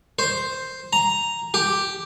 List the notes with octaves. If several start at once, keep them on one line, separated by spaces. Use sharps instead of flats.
C5
A#5
G4